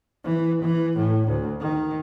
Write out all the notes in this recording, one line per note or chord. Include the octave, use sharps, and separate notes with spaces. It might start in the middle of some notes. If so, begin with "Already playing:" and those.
E3
E3
A2
D2
D#3